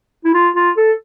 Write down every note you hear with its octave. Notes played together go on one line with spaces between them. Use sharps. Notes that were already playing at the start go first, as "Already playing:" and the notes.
E4
F4
F4
A4